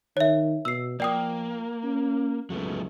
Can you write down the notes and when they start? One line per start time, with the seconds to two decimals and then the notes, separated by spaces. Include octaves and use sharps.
0.17 D#3 C#5 E5
0.65 B2 E6 C7
1.00 F3 A#3 D5 G5 D#6
1.84 C#4
2.50 C#2 F#3 A3 B3